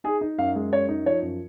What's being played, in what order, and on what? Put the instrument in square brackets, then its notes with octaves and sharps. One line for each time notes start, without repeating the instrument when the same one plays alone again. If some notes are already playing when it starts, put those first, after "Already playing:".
[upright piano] D#4 [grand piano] G#4
[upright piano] D#4
[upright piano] F#2 [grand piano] F5
[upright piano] G#3
[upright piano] F#2 [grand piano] C#5
[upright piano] D#4
[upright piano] F3 [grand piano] C#5
[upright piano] F#2